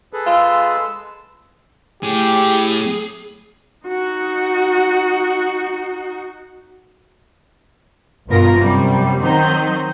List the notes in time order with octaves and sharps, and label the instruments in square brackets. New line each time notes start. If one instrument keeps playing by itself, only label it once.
[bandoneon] G#4 A4 B4
[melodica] G#3 E6 [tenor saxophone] F4
[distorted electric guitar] A2 [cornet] G4 [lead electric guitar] G#4
[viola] D#4 F#4
[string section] G1 G2 B2 F4 A#4 A#6
F#2 C3 G3
D#3 F#3 C4 D#4 D#5 G6